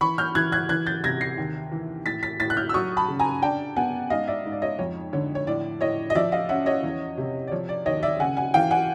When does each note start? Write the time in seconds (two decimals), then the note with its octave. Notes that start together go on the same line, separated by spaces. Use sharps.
0.01 E3 B5 C#6
0.18 F6 G6
0.35 E3 F#6 G#6
0.52 F#6 G#6
0.69 E3 F#6 G#6
0.87 G6 A6
1.04 C3 G#6 A#6
1.21 A#6 C7
1.38 D#2
1.72 E3
2.06 A2 A6 B6
2.23 A6 B6
2.40 A2 A6 B6
2.50 F#6
2.57 F6 G6
2.69 E6
2.74 F#3 C#6 D#6
2.97 A5 B5
3.08 C#3
3.19 G#5 A#5
3.42 D4 G5 A5
3.76 B3 F#5 G#5
4.10 G#2 D#5 F5
4.27 D5 E5
4.45 G#2
4.52 D5
4.62 C#5 D#5
4.79 F2 C#5
5.13 D3 C#5
5.35 C#5
5.47 A2 D5
5.81 A2 C#5 D#5
6.10 D#5
6.15 F3 D5 E5
6.32 D#5 F5
6.49 C#4 E5 F#5
6.66 C#5 D#5
6.84 E2
7.18 C3
7.47 D5
7.52 F3 C#5
7.69 D5
7.86 D#2 C#5 D#5
8.03 D5 E5
8.20 C#3 F#5 G#5
8.37 F#5 G#5
8.54 E3 F5 G5
8.71 F#5 G#5